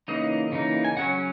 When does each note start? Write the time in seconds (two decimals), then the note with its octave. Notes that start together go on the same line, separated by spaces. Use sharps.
0.08 C#3 E3 A#3 D#4 D#5
0.52 C#3 E3 A#3 D#4
0.85 G#5
0.97 C#3 F#3 C#4 F#5